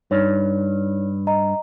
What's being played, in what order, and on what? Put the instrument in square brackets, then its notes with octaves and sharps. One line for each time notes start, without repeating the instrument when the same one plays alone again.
[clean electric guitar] G2 [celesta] D#4 C#5
[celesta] D#5 A#5